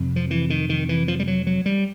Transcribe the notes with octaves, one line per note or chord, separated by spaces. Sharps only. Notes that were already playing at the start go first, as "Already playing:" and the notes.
Already playing: F2 C3
F3
E3
D#3
D#3
E3
F3
G3
F#3
F#3
G3